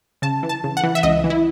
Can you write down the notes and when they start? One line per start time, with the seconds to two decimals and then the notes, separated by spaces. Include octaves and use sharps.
0.22 C#3 A5
0.43 E3
0.49 A5
0.64 C#3
0.77 F#5
0.83 E3
0.95 E5
1.03 C#2 D#5
1.24 E3
1.30 E4